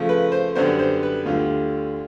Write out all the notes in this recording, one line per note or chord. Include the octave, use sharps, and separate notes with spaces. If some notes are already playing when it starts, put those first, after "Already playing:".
Already playing: C#3 F3 A3
B4
C5
F#2 D3 G3 B3 C5
C5
B4
D2 D3 G3 F4